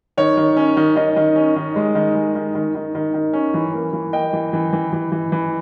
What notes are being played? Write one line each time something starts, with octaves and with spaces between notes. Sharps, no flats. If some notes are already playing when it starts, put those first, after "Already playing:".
D#3 C#5
D#3
C#4
D#3
D#3 D#5
D#3
C#4
D#3
G#3
D#3
G#3
D#3
D#3
D#3
D#3
D#3
C#4
E3
A#3
E3
A#3 D#5 G5
E3
E3
E3
E3
E3
E3